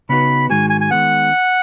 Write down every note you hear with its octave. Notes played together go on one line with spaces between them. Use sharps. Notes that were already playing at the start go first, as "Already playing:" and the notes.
C#3 B3 D#4 F#4 B4 B5
G#2 D#3 G#3 D#4 F#4 G#5
G#5
G#5
D#3 G#3 B3 F#5